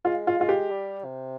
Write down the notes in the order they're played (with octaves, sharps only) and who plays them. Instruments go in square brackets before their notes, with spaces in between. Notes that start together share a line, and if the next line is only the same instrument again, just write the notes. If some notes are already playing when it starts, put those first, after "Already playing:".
[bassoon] G#3 [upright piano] F4
[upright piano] F4
[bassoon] G#3 [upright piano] F4
[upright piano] G4
[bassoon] G3
C3